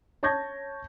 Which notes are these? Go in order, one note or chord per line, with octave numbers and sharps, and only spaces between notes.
C#5 A5 C#6 G6 G#6 A#6